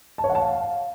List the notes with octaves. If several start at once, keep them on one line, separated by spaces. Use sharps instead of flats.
A5
C#5
F#5
A5
F5